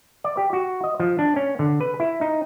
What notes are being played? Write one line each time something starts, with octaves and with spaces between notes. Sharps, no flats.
D5
G4
F#4
D#5
F3
D4
C#4
D3
B4
E4
D#4